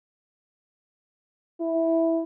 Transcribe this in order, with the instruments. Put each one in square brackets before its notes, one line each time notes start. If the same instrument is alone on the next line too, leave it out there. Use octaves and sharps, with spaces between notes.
[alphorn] E4